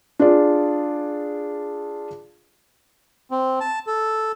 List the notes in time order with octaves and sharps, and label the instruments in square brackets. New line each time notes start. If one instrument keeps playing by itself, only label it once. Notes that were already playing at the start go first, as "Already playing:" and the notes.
[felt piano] D4 F4 G#4 D5
[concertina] C4
A5
A4